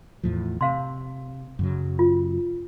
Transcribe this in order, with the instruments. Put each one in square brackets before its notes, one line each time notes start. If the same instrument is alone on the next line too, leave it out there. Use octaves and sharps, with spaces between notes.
[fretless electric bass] E2 A2 F3
[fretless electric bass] C3 [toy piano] F5 C6
[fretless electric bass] F#2 C#3 F#3
[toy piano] F4